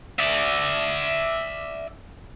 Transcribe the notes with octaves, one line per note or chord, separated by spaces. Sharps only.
D5 E5